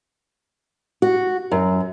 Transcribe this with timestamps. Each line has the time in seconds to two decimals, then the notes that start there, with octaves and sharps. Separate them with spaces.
1.02 F#4
1.52 F#2